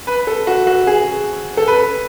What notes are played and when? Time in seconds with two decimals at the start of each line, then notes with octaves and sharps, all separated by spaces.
0.07 B4
0.27 A4
0.47 F#4
0.67 F#4
0.87 G#4
1.57 A4
1.68 B4